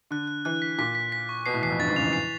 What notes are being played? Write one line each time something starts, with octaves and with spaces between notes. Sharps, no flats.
D3 F#6
F#6
E3 F#6
B6
A#2 B6
B6
B6
C#6
B2 C7
A2
E2 C7
F2
G2 A6
G#2
C#3 F7
E3
C7